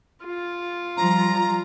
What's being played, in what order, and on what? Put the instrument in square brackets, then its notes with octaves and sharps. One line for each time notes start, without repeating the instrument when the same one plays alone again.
[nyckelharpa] F4
[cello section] F3 G3 [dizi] A#5